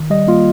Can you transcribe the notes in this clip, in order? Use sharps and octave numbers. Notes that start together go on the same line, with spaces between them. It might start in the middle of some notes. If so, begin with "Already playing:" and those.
Already playing: D#3
G3 D#5
A#3 F4